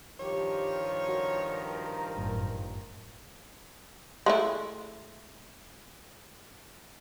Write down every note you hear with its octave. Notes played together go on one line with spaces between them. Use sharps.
G2 D#3 F3 G4 C#5
F#4 A#4
G1 F#2 A2
G#3 A3 E4